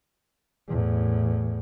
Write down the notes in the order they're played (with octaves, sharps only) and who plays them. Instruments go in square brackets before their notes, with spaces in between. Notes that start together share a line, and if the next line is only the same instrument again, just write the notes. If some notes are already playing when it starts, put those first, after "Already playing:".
[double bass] E2 A2